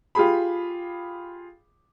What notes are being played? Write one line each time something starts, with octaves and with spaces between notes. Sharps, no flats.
F4 G4 G#4 B5